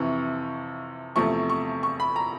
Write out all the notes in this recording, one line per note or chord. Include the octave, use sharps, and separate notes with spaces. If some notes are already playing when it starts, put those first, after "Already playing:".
Already playing: F2 C3 E3 C#6
E2 C3 F3 A3 C#6
C#6
C#6
B5
A#5